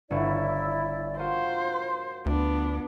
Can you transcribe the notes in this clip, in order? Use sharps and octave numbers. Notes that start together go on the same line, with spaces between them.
G1 E4 C#5 D5 E5
F4 F#4 A#4 C5 C6
D2 B3 D4